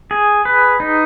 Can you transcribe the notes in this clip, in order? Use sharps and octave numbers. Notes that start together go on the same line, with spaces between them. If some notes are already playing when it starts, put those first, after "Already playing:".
G#4
B4
D#4